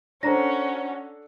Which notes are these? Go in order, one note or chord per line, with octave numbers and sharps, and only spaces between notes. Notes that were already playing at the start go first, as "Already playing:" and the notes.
C#4 D4 F#4 A4 C5 A#5 A#6